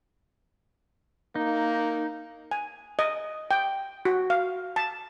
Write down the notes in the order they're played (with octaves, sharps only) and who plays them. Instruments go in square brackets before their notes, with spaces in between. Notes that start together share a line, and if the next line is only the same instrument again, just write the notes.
[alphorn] A#3 [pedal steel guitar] D#4
[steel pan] G#5
D#5
G5
F#4
F5
A5